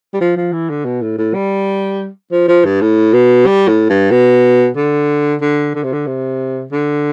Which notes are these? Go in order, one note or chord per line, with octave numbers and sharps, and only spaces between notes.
G3
F3
F3
E3
D3
B2
A2
A2
G3
F3
F3
G2
A2
B2
G3
A2
G2
B2
D3
D3
D3
C3
D3
C3
D3